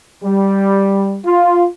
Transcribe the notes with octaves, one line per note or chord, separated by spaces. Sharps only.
G3
F4